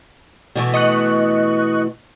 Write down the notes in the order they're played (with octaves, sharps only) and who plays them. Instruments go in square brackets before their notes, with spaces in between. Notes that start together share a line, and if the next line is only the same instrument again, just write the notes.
[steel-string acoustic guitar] B2 E3 A3
[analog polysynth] D#5 C#6 F#6